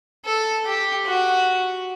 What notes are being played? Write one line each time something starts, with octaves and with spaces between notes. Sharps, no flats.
A4
G4
F#4